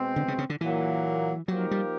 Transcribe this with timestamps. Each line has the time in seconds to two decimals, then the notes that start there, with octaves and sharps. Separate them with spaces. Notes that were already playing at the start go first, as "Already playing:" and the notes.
Already playing: B2 G#3 C4
0.16 D3
0.28 C#3
0.38 C#3
0.50 D3
0.60 A#2 E3 F#3 A#3
1.48 F3 F#3 A#3 D#4 G4 A#4
1.71 G3